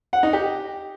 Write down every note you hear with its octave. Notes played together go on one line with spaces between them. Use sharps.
F#5
D#4
G4